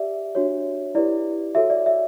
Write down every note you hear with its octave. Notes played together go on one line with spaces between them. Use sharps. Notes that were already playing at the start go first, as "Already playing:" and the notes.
Already playing: G4 D5 E5
D4 F#4 C#5
E4 G4 B4 D5
F#4 A4 C#5 E5
D5
E5